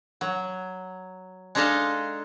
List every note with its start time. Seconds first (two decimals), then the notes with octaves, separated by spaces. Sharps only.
0.21 F#3
1.55 G#3 D4 D#4 A4 D#5 F5